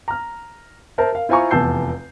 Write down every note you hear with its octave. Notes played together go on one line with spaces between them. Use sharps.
A#5 F6
A#4 C5 E5 A5
A#4 F5
E4 F4 C5 G#5 A#5 C#6
F1 E2 A5 E6 G6 C7